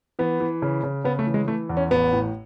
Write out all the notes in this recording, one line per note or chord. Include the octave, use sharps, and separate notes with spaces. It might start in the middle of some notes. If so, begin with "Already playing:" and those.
E3 B3
E3
C#3
C#3
C#3 B3
A3
E3
G#3
E3 A3
E2
C#4
A1 B3
A2